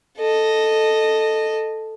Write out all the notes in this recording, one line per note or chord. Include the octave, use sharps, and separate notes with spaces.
A4 D#5